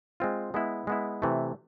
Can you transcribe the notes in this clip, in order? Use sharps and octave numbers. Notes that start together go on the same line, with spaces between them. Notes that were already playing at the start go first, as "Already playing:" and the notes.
G#3 C4 F4
G#3 B3 E4
G#3 B3 E4
C3 E3 A3